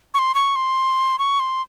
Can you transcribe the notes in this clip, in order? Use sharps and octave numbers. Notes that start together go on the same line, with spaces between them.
C#6
C6
C#6
C6
C#6
C6